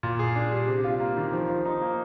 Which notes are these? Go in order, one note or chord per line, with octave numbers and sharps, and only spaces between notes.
A#2
G#4
D4
G3
C3
F4
A#3
D#3
F3
F3
D#4
A#3